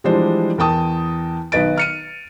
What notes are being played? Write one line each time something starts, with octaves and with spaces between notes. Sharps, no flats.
E3 F3 G3 G#3 D4 C5
E2 A#4 G5 A5 D#6
B1 D#3 B4 D#5 A6 D7
F6 C#7 D#7